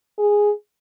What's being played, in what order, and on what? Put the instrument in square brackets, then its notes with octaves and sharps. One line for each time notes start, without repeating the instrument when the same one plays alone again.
[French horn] G#4